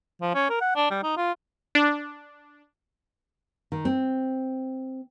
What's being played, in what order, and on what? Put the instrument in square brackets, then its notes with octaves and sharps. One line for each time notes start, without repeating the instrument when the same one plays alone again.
[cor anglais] F3
C#4
A#4
F#5
D4
G3
D#4
F4
[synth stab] D4
[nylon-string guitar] D#3
C4